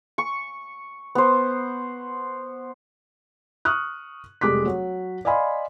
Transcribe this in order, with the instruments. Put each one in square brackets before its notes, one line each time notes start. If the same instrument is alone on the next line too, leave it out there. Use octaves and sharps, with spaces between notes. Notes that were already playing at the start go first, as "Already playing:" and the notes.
[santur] C#6
B3 C5
[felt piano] C#6 D#6 F6 F#6
F1 G3 G#3 D6 F#6 B6
F#3 C#5
D5 D#5 F5 G#5 B5 C6